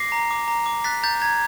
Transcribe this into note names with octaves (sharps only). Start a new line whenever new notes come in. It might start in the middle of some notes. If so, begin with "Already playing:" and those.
Already playing: D6 A#6 C7
A#5
D6
A#5
D6
F#6 A6 B6
A#5 G6 A6
A#5 G#6